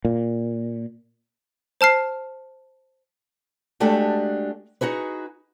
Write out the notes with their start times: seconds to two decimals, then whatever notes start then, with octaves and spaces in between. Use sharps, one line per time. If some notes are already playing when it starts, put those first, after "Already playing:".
0.05 A#2
1.81 C5 A5 F6 C7
3.80 G#3 A3 D4 F#4 G4
4.81 D#4 F#4 G#4 B4